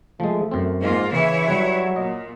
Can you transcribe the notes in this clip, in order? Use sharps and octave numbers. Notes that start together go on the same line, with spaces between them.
F3 G#3 A3
F#2 C4
G#2 A#3 F4
C#3 E3 E4 C#5
F#3 G3 B4
A#2 D#5